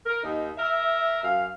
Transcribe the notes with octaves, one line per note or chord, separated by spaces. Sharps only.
A#4
D#2 D#4
A#4 E5
F#2 F5